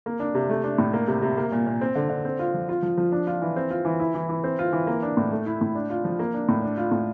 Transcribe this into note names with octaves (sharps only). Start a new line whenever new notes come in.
A#3
D4
C3
A3
D4
A2
A#3
C3
C3
A#3
A#2
A#2
C4
D3
D3
C4
F4
F3
F4
F3
F3
D4
F4
E3
C4
F4
E3
E4
E3
E3
C4
F4
E3
A#3
D4
A2
A3
E4
A2
D4
F4
F3
A#3
D4
A2
D4
F4
A2